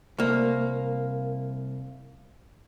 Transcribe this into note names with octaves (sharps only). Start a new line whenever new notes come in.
C2 A#3